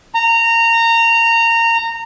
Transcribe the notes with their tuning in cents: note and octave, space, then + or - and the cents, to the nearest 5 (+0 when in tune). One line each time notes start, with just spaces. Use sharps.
A#5 -20